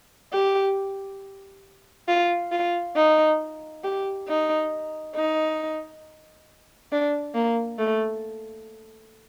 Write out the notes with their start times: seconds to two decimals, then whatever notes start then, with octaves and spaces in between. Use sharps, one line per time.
0.33 G4
2.08 F4
2.52 F4
2.96 D#4
3.84 G4
4.28 D#4
5.15 D#4
6.92 D4
7.35 A#3
7.79 A3